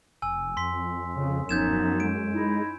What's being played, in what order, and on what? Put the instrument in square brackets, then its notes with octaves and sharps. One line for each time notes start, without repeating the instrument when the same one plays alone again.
[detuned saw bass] F1 [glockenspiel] G#5 E6
[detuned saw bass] F2 [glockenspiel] C6 B6
[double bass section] C#3
[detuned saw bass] D#1 [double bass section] F#2 [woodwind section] F3 B3 D#4 [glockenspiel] G6 G#6 E7
[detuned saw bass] G#3 [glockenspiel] D7
[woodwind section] D#4 E4